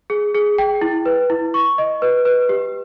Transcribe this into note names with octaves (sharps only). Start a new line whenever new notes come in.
G#4
G#4
G5
E4
B4
E4
C#6
D#5
B4
B4
G4